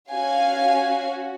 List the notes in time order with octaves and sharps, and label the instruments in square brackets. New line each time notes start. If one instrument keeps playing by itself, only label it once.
[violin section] C#4 F#4 F5 G#5